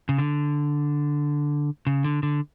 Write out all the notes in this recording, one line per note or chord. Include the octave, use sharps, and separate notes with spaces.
C#3
D3
C#3
D3
D3